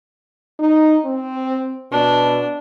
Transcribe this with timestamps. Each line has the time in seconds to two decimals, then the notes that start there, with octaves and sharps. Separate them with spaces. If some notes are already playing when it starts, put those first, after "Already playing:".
0.59 D#4
1.05 C4
1.92 B2 D4